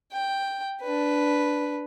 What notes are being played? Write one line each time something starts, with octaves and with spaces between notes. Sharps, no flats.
G5
D4 B4